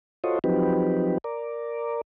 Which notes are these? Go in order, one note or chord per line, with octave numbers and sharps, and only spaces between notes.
F4 F#4 A4 C5 C#5 D#5
F3 F#3 C4 D#4 G4 B4
A#4 D5